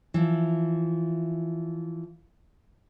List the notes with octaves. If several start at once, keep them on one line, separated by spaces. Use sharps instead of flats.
E3 F3